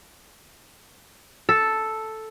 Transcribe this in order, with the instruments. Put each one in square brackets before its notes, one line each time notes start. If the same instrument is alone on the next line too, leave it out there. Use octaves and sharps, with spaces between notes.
[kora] A4